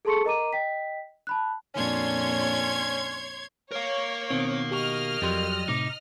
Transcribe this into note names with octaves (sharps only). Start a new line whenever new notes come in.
G#4 A4 A5 C6 C#6 C#7
A#4 D#5 A#5 D6 D#7
D#5 G5 B6
A5 B5 F#6
F2 A#2 C#4 D4 C#5 C6 G#6
A#4 C#5 F5
B2 D#3 C4
G4 D#5 C#6 F6
F2 F#3 G3 G4 C6
A2 C3 D#4 D6